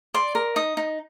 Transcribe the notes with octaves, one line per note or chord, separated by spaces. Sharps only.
D5 C6
A#4
D#4 D#6
D#4